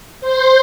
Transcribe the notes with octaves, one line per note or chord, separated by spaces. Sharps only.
C5